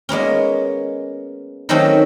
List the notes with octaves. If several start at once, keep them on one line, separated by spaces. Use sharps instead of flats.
G#3 A#3 B3 C#4
D#3 F#3 A3 A#3 C4 C#4